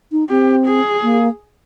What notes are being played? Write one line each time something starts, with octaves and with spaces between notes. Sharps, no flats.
D#4
C4 G4
G#4
A#3